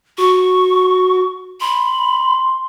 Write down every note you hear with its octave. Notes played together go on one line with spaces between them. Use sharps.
F#4 C#6
B5 C6